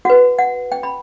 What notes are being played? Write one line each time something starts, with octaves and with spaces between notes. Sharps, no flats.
F#4 B4 F#5
F#5
G5
B5